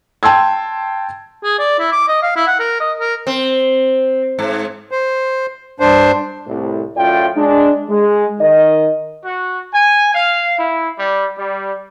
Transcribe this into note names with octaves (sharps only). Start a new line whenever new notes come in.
G5 A5 C6 E6 G#6
G#4
D5
E4
D6
D#5
F5
E4
F#5
A#4
D#5
A#4
C4
G#2
C5
G2 D4 C5
C2 A2
F#2 A2 F4 D5 G5
G#3 D4
G#3
D#3 D#5
F#4
G#5
F5
E4
G3
G3